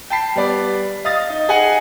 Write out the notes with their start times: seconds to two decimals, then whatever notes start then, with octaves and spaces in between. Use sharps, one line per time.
0.10 G5 A5 B5 C7
0.36 G3 B3 D5
1.04 D#5 F5 D#6 A6 A#6
1.30 D#4
1.48 D#4 G#4 F#5 G#5